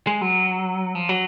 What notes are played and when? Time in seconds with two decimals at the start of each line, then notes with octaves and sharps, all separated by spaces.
0.07 G#3
0.21 F#3
0.95 F3
1.09 F#3